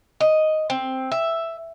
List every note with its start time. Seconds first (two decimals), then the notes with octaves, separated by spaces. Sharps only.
0.20 D#5
0.70 C4
1.11 E5